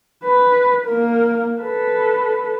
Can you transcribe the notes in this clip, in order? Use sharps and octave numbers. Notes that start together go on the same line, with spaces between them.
B4
A#3 A#4
A4 B4